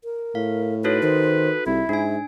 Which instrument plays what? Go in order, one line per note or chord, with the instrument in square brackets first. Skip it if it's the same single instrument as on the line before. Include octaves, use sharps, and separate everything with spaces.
[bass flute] A#4
[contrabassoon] A2 [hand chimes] F5
[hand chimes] D#4 F#4 A4 [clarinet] B4 [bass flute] C#5
[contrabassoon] D#3 [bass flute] C5
[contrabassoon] C2 [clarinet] E4 [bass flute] E5
[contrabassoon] G#2 [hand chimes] D4 G#5